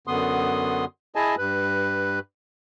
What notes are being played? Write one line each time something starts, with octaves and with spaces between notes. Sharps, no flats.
F#2 D3 B3 C6 D#6
E4 G#4 D#5 G#5 A5
G2 B4